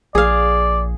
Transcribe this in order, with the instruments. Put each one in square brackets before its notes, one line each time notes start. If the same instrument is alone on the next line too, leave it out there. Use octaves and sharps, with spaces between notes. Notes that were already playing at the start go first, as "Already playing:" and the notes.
[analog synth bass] A#1 [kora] G#4 F5 [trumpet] D5